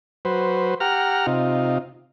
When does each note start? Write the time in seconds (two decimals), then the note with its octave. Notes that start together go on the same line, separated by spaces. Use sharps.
0.25 F#3 B4 C5
0.80 G4 F#5 A#5 F6
1.27 C3 D#4 F4